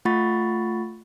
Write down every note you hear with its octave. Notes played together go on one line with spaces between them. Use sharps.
A3 F4 F#5 B5 C#6 A6